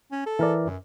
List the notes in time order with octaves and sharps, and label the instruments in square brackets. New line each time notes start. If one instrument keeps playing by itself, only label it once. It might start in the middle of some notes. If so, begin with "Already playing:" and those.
[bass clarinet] C#4
A4
[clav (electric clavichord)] E3 A#4 D5
[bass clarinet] F#2